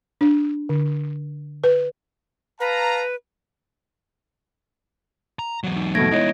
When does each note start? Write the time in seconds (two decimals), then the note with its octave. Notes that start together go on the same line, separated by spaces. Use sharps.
0.21 D4
0.69 D3
1.64 B4
2.60 B4 F5 A5 A#5
5.39 A#5
5.64 E2 F#3
5.76 D#4
5.95 B2 A3 G#6 A#6 D7
6.11 G#3 B3 D#4 E4 C#5